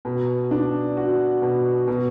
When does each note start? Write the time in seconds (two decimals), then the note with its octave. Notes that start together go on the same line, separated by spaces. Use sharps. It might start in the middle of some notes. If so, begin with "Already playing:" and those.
0.05 B2
0.51 D4
0.97 F#4
1.42 B2
1.88 B2